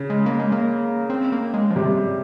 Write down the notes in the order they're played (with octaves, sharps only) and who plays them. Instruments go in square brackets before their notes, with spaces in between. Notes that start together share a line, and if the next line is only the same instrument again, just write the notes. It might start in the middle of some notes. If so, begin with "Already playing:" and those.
Already playing: [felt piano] C#3
[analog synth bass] G#3
A#3
G#3
A#3
C4
A#3
G#3
F3
[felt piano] C3 [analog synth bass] G3